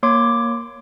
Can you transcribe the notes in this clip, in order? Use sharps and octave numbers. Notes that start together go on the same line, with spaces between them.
A#3 C#5 C6 D6